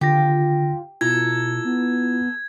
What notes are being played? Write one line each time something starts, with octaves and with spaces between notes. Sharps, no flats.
D3 F4 G4 A#6
B2 E4 F4 A4 A#5 G#6
B3